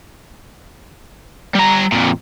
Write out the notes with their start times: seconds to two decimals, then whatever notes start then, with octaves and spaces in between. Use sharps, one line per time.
1.55 G3 A#5
1.92 F2 A#2